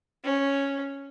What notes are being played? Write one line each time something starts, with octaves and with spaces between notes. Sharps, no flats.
C#4